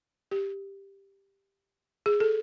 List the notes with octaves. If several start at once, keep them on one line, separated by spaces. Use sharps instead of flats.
G4
G#4
A4